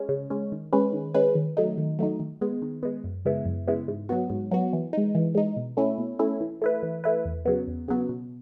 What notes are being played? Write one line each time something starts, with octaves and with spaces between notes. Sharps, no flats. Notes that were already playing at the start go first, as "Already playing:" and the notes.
Already playing: G#3 C#4
C#3
G#3 C#4
D#3
G#3 C#4 G#4 B4
D#3
G#3 C#4 G#4 B4
D#3
F#3 A3 D#4
D#3
F#3 A3 D#4
D#3
G#3 B3
D#3
G#3 B3
F#2
C#3 G#3 B3 E4
F#2
C#3 G#3 B3 E4
G#2
F#3 B3 F#4
G#2
F#3 B3 F#4
E3
G#3 D#4
E3
G#3 D#4
B2
A3 C#4 E4
B2
A3 C#4 E4
E3
A3 E4 B4
E3
A3 E4 B4
E2
C#3 F#3 B3
E2
C#3 F#3 B3
B2